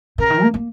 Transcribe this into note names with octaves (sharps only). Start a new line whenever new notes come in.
C#3 A#4
D#3
A#3
A#3